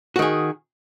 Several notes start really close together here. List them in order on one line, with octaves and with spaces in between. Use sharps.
F#4 D#3 G#4